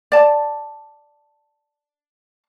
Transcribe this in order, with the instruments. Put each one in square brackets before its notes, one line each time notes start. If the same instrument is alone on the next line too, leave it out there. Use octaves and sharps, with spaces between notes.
[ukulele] D5 A5